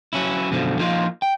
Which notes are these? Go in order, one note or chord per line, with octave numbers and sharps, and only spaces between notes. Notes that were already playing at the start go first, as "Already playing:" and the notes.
F#3 C#4 E4
F#2 B2 D3 E3 F3
F3 A#3 D#4 F4
G5